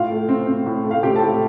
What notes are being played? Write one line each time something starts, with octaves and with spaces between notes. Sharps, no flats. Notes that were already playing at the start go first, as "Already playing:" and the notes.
Already playing: A2 F4 F5
A3
C4
C4
A2
A3
F5
C4 G4 G5
A4 A5
A2